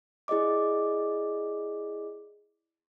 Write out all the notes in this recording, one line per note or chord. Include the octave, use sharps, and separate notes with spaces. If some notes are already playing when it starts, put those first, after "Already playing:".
E4 G#4 D5 D#5 D6